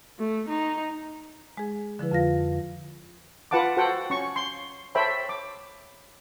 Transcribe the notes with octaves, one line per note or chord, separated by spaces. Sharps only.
A3
D#4
G#3 G#4
D3 F3 E4 B4
F2 F4 F5 A#6
F4 B4 F#5 A5 D6
F#4 A4 C5 F#5 G5
C#4 C#6
C6
A4 C5 C#5 E5 G5 B5
D6